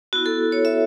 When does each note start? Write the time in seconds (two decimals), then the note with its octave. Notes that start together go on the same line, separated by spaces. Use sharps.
0.13 B3 E4 F#4
0.26 A4
0.52 C#5
0.65 E5